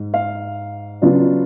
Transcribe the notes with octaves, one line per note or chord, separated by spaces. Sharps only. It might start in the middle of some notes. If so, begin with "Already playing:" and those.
Already playing: G#2
F5
C#3 F#3 B3 D4 F4